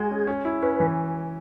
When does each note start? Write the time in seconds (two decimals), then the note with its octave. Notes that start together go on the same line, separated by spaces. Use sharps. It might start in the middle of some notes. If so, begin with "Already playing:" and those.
Already playing: G#3 F#4 G#4
0.11 C#4
0.27 C#4
0.45 E4
0.62 C#4 B4
0.80 E3